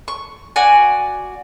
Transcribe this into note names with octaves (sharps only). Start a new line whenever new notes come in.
C#6
F#4 D5 G#5